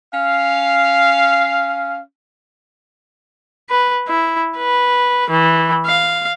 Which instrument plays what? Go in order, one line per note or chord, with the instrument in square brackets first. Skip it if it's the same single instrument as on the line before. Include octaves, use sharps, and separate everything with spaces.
[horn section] C#4 F5
[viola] B4
E4
B4
E3
F5